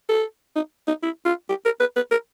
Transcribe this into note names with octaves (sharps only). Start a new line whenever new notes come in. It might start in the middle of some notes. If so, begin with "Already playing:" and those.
A4
D#4
D#4
E4
F4
G4
A#4
B4
B4
A#4